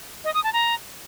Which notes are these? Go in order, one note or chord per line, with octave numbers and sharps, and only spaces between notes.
D#5
D#6
A5
A#5